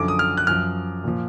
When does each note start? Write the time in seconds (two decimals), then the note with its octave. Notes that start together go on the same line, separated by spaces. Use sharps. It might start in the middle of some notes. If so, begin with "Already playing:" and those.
Already playing: F#2 D3 F3 D6
0.08 D#6
0.19 F6
0.37 F#6
0.47 F#2 F3 F6
1.04 A#2 F3